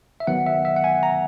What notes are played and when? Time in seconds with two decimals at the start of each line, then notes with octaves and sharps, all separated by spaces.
0.20 E5
0.27 D#3 F#3 B3 F#5
0.46 E5
0.65 E5
0.76 F#5
0.84 G#5
1.03 A#5